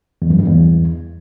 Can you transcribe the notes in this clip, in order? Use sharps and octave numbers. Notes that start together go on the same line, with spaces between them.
E2
F#2
G2
E2